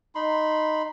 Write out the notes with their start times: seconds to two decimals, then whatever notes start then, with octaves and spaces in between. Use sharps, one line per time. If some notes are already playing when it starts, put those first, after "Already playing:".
0.15 D#4 B5 C6